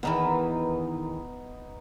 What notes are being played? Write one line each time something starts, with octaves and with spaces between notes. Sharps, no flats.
E2 D#3 E3 B3 D#4